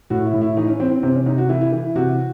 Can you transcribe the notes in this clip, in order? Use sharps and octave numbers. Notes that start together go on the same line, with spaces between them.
A2 F#4
E4
A2
E4
E3 D#4
C#4
E3 C4
C4
C3 C4
C#4
C3 D#4
F#4
E3 E4
E4
E3
E4
C3 F#4